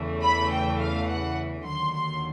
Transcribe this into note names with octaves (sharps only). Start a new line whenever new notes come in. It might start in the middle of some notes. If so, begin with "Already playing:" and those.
Already playing: E2 C#3 E3 A3
B5
G5
F5
F#5
D#2 D3 F#3 C6
C6